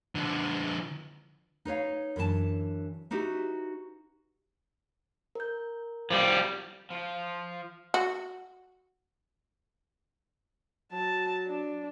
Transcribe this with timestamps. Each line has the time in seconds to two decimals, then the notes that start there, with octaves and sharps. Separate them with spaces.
0.15 D3 F3
1.65 D#4 B4 C#5 F5
2.16 F#2 D3 E3 A#4 A5
3.11 D#4 E4 F#4 G4 B4
5.35 A#4 G6
6.10 F3 G3
6.90 F3 F4
7.94 F#4
10.92 F#3 A5
11.47 D4